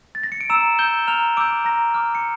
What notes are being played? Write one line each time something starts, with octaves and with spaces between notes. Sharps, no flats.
A6
A#6
C#7
D7
A#5 E6 E7
E6 G6 G7
A#5 F6 F7
D6 E6 G6 D7
A#5 A#6
D6 F6
C#7